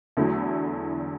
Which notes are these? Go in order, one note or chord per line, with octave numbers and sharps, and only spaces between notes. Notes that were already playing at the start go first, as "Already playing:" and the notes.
E2 D3 F#3 A3 E4